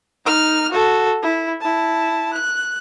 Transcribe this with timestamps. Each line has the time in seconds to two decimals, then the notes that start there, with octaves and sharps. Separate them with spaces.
0.25 D#4 F6
0.71 F#4 A4
1.23 E4
1.61 E4 A5
2.33 F#6